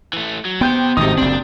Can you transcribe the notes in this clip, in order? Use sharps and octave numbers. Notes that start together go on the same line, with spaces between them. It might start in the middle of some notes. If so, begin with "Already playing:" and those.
E3 A3
F#3
B3 G4 C5 G5 G6
G#1 A2 C3 D#4 D#6
F#1 C4 D4